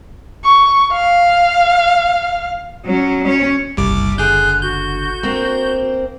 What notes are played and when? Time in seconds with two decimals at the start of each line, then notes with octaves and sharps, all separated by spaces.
0.44 C#6
0.92 F5
2.86 F#3 C#4
3.24 C#4 C#5
3.77 F#1 C2 G3 D6
4.18 D3 G#4 F#6 G6
4.62 F#4 G6
5.23 A#3 C4 D4